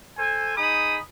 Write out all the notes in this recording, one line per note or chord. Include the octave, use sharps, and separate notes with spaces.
A4 C5 G#5
D#4 G#4 B5 D#6